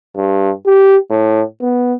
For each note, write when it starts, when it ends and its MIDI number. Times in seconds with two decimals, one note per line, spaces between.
0.17 0.50 43
0.66 0.97 67
1.10 1.42 45
1.62 1.95 59